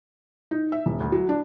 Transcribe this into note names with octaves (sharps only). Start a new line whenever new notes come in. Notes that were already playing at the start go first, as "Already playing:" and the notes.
D#4
E5
D#1
D2
F#3
D4